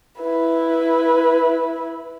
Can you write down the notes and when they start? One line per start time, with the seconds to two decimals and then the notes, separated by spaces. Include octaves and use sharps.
0.19 E4 B4